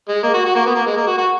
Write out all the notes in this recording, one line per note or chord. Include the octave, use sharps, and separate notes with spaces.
G#3
A#3
F#4
F#4
A#3
B3
A#3
G#3
A#3
F#4
F#4